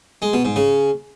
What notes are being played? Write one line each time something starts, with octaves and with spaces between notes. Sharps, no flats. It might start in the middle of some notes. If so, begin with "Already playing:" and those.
G#3
B2
G#2
C#3